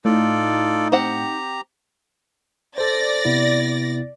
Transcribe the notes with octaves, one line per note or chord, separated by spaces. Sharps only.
A2 D#4 F4 A4 D5
C4 G4 C5 F#5 A#5
A4 C5 D5 A6 A#6
C3 B3 E4